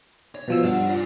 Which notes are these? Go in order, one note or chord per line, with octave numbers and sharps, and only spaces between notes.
C#5
B2 F3 E6
G2 D5 F#5
F4 D5